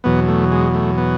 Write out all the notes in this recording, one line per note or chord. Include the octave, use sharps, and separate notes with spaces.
E2 B2 F#3 B3
A3
G#3
A3
B3